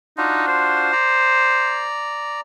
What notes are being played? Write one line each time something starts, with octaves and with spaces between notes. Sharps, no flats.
D4 D#4 F4 F#4
C5
D5 A#5